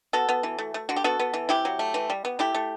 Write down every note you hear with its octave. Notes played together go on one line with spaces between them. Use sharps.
B3 F#4 A4
B3
E3
A3
A3
D3 F#4
G4
B3 F#4 A4
B3
E3
C3 E4 G4
F#3
A3
E3
G3
B3
A3 E4 G4
A3